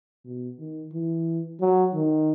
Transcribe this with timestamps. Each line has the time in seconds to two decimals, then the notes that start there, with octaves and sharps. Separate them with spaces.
0.25 B2
0.59 D#3
0.93 E3
1.60 F#3
1.94 D#3